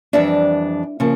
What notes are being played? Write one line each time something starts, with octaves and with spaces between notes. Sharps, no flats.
F2 E3 G3 D4 E5
C#3 F3 A#3